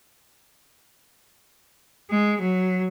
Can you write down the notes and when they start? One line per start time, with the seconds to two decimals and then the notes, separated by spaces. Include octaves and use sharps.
2.10 G#3
2.41 F#3